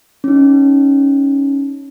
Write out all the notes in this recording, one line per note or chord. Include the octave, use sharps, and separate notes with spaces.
C#4 D#4